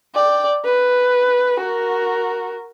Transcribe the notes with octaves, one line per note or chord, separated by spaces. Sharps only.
D5 G5
B4
F#4 A#4